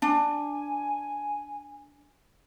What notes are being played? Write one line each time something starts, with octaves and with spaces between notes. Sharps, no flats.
D4 G#5